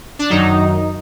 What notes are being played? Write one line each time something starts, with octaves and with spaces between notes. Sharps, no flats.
D4
F#2 D#3 F#3 D#4